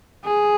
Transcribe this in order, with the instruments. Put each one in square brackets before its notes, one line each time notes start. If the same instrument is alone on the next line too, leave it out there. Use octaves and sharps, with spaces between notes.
[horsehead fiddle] G#4